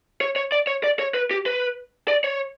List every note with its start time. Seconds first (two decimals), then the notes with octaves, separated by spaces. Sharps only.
0.21 C#5
0.36 C#5
0.52 D5
0.67 C#5
0.84 D5
0.99 C#5
1.14 B4
1.31 G4
1.46 B4
2.08 D5
2.24 C#5